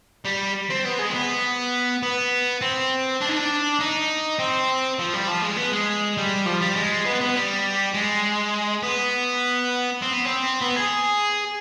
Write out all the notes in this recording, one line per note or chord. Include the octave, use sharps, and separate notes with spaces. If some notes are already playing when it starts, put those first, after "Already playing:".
G3
C4
B3
G#3
C4
B3
B3
C4
D4
D#4
D4
D#4
C4
F3
G3
F3
G#3
B3
G#3
G3
F3
G3
G#3
B3
B3
G3
G#3
B3
C4
B3
C4
B3
G#4